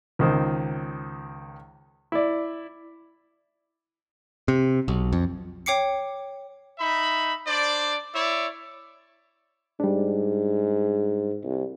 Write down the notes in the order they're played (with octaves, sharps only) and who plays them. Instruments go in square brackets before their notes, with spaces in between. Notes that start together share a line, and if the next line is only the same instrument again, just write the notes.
[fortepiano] C#2 D#3 C5
E4 D5
[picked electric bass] C3
B1
F2
[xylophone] C#5 G5 D6 C7 C#7
[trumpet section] D#4 E5 B5
D4 C5 D5
E4 C#5 D5 E5
[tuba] G#2 [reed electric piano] G3 D4
[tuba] C2